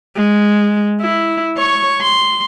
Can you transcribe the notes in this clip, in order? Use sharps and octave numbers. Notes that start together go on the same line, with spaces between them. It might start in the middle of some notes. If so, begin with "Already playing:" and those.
G#3
E4
C#5 C#6
C6